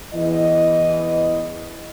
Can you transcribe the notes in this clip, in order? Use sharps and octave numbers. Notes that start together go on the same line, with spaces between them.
E2 E3 D#5